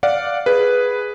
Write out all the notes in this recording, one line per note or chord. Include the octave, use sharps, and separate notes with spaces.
D5 F5 F#5
G#4 B4